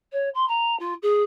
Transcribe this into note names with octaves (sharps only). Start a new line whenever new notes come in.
C#5
C6
A#5
F4
G#4